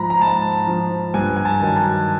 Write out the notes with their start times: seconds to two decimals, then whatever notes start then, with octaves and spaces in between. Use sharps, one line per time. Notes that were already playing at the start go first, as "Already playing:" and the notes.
Already playing: G#2 F3 A#5 B5
0.10 A#5
0.22 G#2 A5
0.67 F3
1.14 G2 G#5
1.37 G#5
1.45 A5
1.61 D#3 F#3
1.76 A5